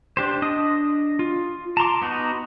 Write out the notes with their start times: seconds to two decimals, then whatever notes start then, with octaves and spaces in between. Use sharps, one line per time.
0.17 D4 G4 C5
0.42 D4 D#5 D#6
1.19 F4
1.77 A5 A#5 C6 D6
2.02 B3 D#4 F#4